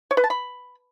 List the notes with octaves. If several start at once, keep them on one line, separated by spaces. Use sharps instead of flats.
C#5
B4
A5
B5